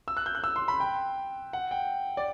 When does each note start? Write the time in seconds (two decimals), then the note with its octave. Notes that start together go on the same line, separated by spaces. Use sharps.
0.08 E6
0.17 F#6
0.26 G6
0.35 F#6
0.44 E6
0.56 C6
0.68 B5
0.80 G5
1.53 F#5
1.71 G5
2.17 D5